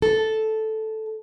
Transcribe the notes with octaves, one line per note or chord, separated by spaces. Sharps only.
A4